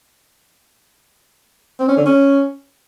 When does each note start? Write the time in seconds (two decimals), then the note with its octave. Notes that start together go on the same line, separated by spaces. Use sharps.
1.80 C4
1.88 C#4
1.97 D3
2.06 C#4